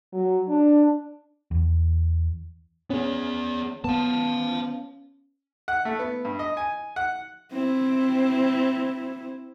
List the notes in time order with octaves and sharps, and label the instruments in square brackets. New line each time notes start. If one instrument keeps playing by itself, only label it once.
[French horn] F#3
D4
[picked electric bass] E2
[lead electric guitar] B3 G#4 [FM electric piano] C#4
[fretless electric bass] B3 [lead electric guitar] F5 A5
[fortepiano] F#5
A3
B3
G2
D#5
G#5
F#5
[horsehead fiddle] C4 E4